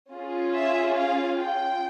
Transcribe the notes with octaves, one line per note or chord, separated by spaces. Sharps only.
C#4 F4 G#4
E5
F5
G5